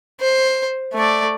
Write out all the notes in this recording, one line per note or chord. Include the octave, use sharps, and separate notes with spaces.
C5
A3 D5